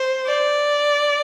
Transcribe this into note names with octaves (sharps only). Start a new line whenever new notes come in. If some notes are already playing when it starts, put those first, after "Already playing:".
Already playing: C5
D5